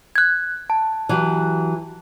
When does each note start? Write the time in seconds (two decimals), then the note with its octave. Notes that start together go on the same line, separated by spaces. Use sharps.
0.16 F#6 G#6
0.70 A5
1.09 E3 F#3 G4